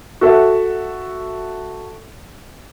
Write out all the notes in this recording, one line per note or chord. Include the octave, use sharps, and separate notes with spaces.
F#4 A4 E5